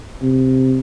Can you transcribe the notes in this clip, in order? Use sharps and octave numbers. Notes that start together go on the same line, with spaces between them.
C3